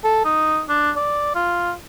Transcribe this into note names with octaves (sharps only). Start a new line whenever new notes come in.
A4
D#4
D4
D5
F4